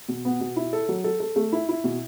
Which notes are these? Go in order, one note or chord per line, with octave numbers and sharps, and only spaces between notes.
B2
B3
B2
E4
A4
F#3
A4
A4
A3
E4
E4
B2